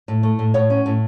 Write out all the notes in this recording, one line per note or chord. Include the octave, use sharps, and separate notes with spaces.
A2
A3
A2
A2 C#5 F#5
C#4
A2